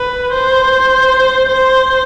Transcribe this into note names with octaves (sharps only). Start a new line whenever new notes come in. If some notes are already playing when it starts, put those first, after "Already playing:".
Already playing: B4
C5
C5